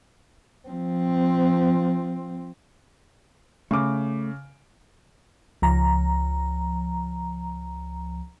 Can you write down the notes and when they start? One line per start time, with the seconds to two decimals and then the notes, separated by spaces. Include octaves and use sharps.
0.68 F3 C4
3.71 C#3 A3 D6
5.62 C#2 F3 A#5